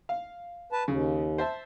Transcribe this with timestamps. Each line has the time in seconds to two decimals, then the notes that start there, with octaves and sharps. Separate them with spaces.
0.09 F5
0.72 B4 A5
0.88 D#2 C#3
1.38 C5 E5 A5